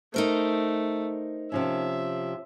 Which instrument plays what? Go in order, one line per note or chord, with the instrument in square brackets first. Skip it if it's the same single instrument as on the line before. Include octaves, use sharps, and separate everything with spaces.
[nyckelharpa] A3 [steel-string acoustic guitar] D#4 A#4 C5
[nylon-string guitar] C3 F3 C#4 [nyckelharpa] E5